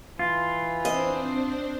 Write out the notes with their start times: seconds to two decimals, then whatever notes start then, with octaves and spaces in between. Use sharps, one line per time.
0.19 E3 F4
0.85 C4 D4 C5 D#5